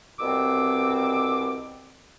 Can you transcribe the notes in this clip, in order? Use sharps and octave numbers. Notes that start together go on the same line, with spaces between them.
C2 B2 C4 D6 E6